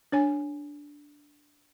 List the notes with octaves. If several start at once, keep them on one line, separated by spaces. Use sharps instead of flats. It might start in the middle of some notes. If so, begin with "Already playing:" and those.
D4 C#5 G#5